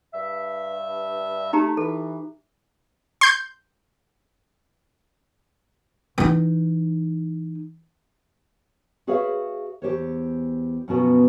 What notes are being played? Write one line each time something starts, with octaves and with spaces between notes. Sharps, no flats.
G2 E5
A3 D#4 G4 A#5
E3 A4
C6 G6
E3 D#4
F#4 G#4 B4 C#5 E5 F5
E2 G4 C5 C#5
F#2 B2 F3 B3 F#4 B4